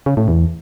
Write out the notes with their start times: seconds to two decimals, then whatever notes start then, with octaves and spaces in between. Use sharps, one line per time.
0.06 C#3
0.17 A2
0.28 E2